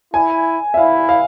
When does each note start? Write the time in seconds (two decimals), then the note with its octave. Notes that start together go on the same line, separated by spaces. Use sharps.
0.14 E4 G#5
0.74 E5
0.77 E4 F5
1.09 F5